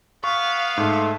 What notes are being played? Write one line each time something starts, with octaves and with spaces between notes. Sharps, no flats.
B3 F5 C#6
G#2 A3